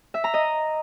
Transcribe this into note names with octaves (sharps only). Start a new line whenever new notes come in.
E5
A#5
D#5